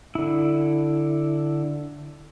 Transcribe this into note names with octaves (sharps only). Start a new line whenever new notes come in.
D3 E4